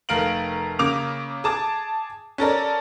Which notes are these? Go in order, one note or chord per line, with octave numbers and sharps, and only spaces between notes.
F1 A3 A#4 F5 D7 F#7
C#3 A#3 D6 F7
G#4 A5 D6
C#4 A4 A#4 D5